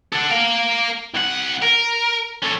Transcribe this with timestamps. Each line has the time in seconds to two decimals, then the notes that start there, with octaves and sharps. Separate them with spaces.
0.12 A4 F#5
0.30 A#4 F5
1.15 C2 F#5
1.62 A#4
2.43 C#4 A4